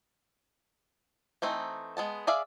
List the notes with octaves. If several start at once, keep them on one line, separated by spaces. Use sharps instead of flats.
E3 A3 C4 D#4
G#3 B3 A5
G#4 D5 E5 F5